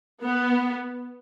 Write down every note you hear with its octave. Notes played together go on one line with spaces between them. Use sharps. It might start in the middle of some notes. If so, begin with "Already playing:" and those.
B3